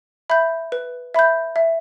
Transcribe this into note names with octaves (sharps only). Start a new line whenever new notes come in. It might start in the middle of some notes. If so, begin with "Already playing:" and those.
E5 B5 G6
B4
E5 B5 G6
E5